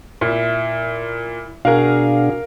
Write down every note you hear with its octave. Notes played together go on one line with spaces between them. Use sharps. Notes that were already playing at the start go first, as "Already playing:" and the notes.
A#2 E4
B2 D4 F#4 G#4 A#4 F5